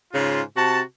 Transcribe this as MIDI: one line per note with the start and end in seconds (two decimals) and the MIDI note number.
0.14 0.42 44
0.14 0.42 49
0.14 0.42 65
0.57 0.81 48
0.57 0.81 66
0.57 0.81 81